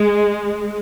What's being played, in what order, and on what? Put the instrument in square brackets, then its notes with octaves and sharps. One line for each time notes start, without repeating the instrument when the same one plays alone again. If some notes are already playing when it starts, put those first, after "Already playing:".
Already playing: [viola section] G#3